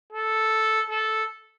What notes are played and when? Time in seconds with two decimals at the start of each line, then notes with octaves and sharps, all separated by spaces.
0.12 A4
0.89 A4